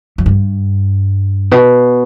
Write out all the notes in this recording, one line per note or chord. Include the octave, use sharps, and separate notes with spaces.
F#2
G2
B2